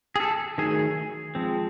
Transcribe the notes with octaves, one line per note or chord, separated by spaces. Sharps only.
G#4
A4
D#3 F#3 A3 G#4
F3 G#3 C4